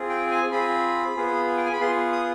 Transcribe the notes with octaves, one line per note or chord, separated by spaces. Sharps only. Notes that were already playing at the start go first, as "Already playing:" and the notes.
Already playing: C4 F4 G#4
G5
G#5
C4 F4 G#4 B5
B3 F4 G#4
G5
G#5
B5
B3 F4 G#4 C6
D#6